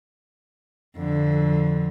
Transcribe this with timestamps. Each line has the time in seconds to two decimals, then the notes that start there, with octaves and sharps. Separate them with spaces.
0.96 F2 D3